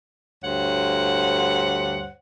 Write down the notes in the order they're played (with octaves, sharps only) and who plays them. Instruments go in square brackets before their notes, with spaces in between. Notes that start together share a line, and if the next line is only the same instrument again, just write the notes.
[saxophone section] D2 G2 C5 C#5 F#5